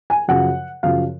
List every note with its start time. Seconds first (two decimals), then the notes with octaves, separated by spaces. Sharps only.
0.10 G#5
0.28 F#2 C#3 F3 F#5
0.83 F#2 C#3 F3 F5